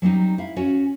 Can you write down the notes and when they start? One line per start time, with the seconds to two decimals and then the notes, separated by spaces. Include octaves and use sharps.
0.02 F#3 G3 C4 D#4
0.38 E4 F5
0.56 C#4 F#4 C#5